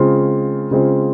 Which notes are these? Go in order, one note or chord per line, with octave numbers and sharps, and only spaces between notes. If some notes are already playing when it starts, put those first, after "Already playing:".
Already playing: C#3 G#3 C4 F4
C#3 G#3 C4 F4